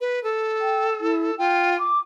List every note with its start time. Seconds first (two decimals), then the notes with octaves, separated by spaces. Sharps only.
0.01 B4
0.24 A4
0.61 G5
1.01 E4
1.38 F4 G5
1.79 D6